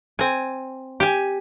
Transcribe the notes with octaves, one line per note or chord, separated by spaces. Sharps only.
C4 G#5
G4 G#5